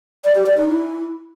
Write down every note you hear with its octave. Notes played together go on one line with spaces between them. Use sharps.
D5
G4
D5
D#4
E4